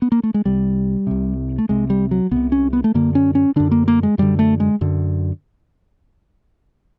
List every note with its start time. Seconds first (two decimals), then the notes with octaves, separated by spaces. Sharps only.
0.02 B3
0.12 A#3
0.23 A3
0.34 G#3
0.45 C2 C3 G3
1.07 C2 C3
1.58 A3
1.69 C2 C3 G#3
1.90 G3
2.11 F#3
2.31 C2 C3 B3
2.52 C#4
2.73 B3
2.84 A3
2.94 F#2 D3 A#3
3.15 C#4
3.35 C#4
3.56 F#2 D3 D4
3.72 A#3
3.88 A#3
4.03 G#3
4.18 F#2 D3 G3
4.39 A3
4.60 G#3
4.81 F#2 D3